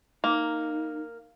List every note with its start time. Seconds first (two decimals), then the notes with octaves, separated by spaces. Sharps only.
0.24 A#3 D#4